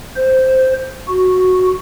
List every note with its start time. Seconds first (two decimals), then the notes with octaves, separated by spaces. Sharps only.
0.16 C5
1.07 F#4